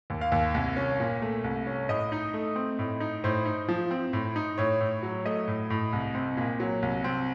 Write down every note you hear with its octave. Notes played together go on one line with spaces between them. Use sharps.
D#2
F5
D#2
C2
C#4
A#2
A3
C2
C#4
A2 D#5
D#4
A3
C4
A2
D#4
A2 C5
D#4
F3
C4
A2
D#4
A2 C#5
A2
F#3
A3 D#5
A2
A2
C2
C4
A#2
F#3
C2
C4